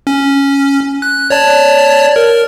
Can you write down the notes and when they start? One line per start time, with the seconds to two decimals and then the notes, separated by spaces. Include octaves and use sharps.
0.07 C#4
1.02 F#6
1.30 C#5 D5 A5
2.16 A#4